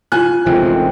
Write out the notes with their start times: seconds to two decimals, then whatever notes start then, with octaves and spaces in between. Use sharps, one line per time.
0.12 F4 G#5 F#6
0.46 A1 C3 D#3 G#3 A3 C4 F4